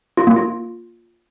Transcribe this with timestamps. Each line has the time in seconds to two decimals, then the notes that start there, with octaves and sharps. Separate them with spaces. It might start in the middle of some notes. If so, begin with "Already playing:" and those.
0.17 F4
0.27 A#3
0.36 F4